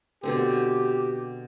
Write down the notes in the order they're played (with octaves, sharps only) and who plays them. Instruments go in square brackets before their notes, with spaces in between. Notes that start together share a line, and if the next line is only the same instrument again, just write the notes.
[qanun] B2 D3 C4 [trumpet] G4